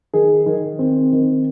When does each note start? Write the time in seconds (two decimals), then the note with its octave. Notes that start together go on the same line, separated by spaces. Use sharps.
0.14 D#3 G#4
0.46 D#3
0.79 C4
1.12 D#3